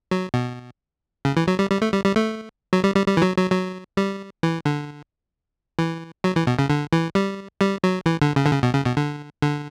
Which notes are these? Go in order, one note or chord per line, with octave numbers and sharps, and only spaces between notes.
F#3
B2
C#3
E3
F#3
G3
G3
A3
G3
G3
A3
F#3
G3
G3
G3
E3
F#3
F#3
F#3
G3
E3
D3
E3
F#3
E3
B2
C#3
D3
E3
G3
G3
F#3
E3
D3
C#3
D3
C#3
B2
C#3
B2
D3
D3